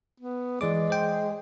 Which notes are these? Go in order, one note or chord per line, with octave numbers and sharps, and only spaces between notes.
B3
E3 G#3 D5 D6
C5 G5